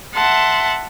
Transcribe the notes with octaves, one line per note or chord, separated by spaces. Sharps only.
E5 F#5 A5 C6